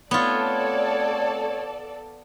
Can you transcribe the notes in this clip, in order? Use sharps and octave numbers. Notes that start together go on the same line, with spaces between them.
A3 B3 C4 F4 A4 C#5 D5